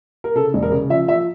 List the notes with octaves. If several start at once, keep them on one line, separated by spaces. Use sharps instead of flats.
A#4
C#3 A4
E1
A#4
C#3
F3 E5
F3 E5